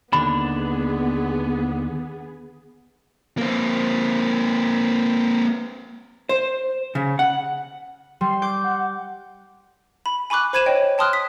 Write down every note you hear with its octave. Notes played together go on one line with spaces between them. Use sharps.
D#2 D3 B3 D4 G#4 B5
A#3 C4
C5
C#3
F#5
G3 C6
D6 G6
F#5
B5
G#5 B5 C#6 D6 F#6
C5 B5 G#6 D#7 E7
C#5 D#5 G5 G#6
G5 A5 C6 D#6 F6 F#6
D#6 B6